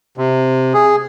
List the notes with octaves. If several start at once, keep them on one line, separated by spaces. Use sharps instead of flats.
C3
G#4